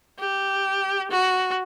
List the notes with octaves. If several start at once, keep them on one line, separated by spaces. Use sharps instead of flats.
G4
F#4